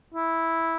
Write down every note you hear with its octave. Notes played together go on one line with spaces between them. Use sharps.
E4